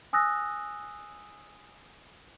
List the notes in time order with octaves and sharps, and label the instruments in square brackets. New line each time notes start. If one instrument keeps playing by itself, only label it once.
[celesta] G#5 D#6 E6 F#6 A#6